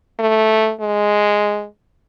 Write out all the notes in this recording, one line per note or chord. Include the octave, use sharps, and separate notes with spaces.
A3
G#3